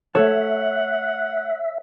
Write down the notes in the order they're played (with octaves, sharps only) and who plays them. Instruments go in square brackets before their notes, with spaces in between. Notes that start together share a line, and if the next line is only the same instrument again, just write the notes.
[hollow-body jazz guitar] A3 A4 A5 [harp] C#5 [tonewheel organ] E5 [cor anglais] F#5